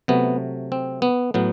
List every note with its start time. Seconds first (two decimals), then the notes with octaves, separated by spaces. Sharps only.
0.08 C3 F#3 A3 B3
0.72 C4
1.02 B3
1.34 A2 F#3 B3